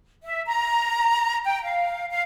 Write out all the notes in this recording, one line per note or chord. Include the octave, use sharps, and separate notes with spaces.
E5
A#5
G5
F5
F5